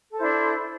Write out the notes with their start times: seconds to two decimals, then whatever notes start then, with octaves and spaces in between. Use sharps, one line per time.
0.12 A4
0.15 C5
0.19 E4
0.23 D4